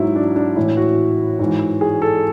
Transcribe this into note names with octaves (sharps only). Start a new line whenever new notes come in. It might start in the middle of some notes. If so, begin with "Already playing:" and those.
Already playing: G#2 F#3 E4
D4
D4
A2 E3 E4
F#4
G#2 E3
G#4
A4